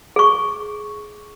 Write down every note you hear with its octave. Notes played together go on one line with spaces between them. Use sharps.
G#4 C#6